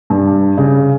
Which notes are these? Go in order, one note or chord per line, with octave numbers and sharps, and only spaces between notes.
G2
C#3